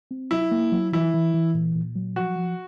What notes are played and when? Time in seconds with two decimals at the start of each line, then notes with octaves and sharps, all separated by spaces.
0.11 C4
0.31 F#3 E4
0.51 A#3
0.72 F#3
0.93 E3 E4
1.14 E3
1.34 E3
1.54 A#2
1.75 A#2
1.95 F#3
2.16 F3 F#4
2.36 F3